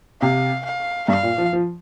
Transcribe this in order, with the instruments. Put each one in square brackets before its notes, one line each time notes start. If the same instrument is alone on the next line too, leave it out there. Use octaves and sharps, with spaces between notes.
[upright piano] C3 [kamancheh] F5
[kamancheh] F5
[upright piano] G2 [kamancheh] F5
[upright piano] A#2
F3
F3